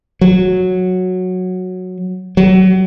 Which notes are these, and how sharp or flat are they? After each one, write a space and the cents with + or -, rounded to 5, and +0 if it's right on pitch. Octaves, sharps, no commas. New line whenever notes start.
F#3 -10
F#3 +25